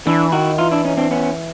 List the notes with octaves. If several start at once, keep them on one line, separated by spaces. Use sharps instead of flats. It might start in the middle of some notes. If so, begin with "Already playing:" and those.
E3 D4 E4
D#3 E4 F#4
E3 D#4 F4
D4 E4
C#4 D#4
C4 D4
B3 C#4